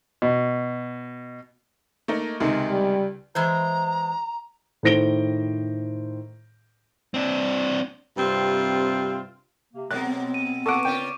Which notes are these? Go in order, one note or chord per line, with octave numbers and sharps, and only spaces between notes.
B2
A3 A#3 D#4
C#2 C3 D#3 G#3
G3
E3 G#3 C5 A#5
A2 D#3 C5 A#6 D7 G7
C4 D4
G2 C3 C4 F4
C3 A#3
B2 F#3 G#3 B3 C4 F#6
D#7
A#2 A4 F#5 C#6 D6 D7
C#3 C#4 F4 G5